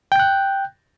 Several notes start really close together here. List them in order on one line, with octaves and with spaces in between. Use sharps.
G5 G6 F#6